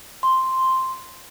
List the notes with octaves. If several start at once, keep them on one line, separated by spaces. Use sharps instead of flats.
C6